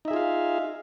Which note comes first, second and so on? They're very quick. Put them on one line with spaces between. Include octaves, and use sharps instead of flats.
D#4 E5 G#4 F4 F5